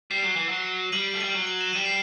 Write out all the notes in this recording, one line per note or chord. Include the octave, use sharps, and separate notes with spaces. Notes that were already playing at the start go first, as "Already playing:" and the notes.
G3 C7 E7
F#3
E3
F#3
G3 D#7 F#7
A3
G3 D#7 F#7
F#3
F#7
E7
G3 D#7
C7 E7